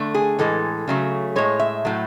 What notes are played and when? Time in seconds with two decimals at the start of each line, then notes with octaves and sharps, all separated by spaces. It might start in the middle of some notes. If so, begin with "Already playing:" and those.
Already playing: D3 A3
0.14 G#4
0.39 A2 E3 G#3 A4
0.88 C#3 F#3 A3
1.36 A2 G#3 C#5
1.59 E5
1.85 A2 F#3 A3